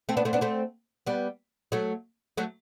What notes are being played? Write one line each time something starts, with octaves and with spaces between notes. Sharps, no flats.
A3 C4
B3 D4
A3 C4
B3 D4
A3 C4
G3 B3
F#3 A3
F#3 A3